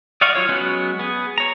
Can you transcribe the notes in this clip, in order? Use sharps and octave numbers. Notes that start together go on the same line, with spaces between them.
D5 D#5 F5 F#5 C#6
F#3 F4 C#5
F#3 G#3 B3 C#4 F#4
B3 G#4
C#5 A#5